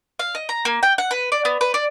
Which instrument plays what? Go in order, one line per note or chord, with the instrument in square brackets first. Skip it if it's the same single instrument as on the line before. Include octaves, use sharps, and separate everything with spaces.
[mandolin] F5
D#5
A#5
A#3
G5
F#5
B4
D5
B3
B4
D5